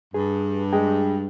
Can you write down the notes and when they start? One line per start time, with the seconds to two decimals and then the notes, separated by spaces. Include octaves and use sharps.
0.14 G2 G#4
0.73 G#3 G5